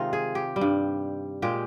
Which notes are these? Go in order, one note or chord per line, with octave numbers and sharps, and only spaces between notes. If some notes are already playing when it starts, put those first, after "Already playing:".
Already playing: C3 D#3 G#3 D#4 F4
G#4
G4
G3
G2
A#2 G#3 G4